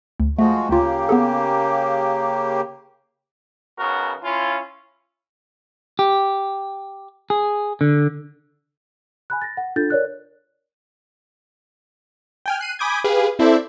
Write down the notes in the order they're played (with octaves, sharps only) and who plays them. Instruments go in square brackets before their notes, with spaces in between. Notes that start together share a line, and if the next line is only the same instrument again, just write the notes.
[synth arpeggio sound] D2
[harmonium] F3 G#3 F#4 [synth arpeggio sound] A3
[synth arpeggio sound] D2 F4 [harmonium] C#3 A#3 G4
[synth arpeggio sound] B3 G#4 A4
[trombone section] B1 C#3 B3 F#4 A#4
C#4 E4 F4
[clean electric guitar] G4
G#4
D3
[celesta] G#5 B5 F#6
A6 A#6
F#5
D4 F4 A4 G6 A6
A#4 C#5 D5 F#6
[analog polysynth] G5 G#5 F6
F#6 C7 D#7
G#5 B5 D6 D#6 G6 G#6
G4 G#4 B4 F5
C4 E4 A4 C5 D5 E5